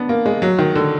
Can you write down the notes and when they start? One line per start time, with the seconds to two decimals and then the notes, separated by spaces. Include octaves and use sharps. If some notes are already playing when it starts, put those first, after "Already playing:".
Already playing: B3 D4
0.09 A#3
0.26 G#3
0.42 F#3
0.59 D#3
0.75 D3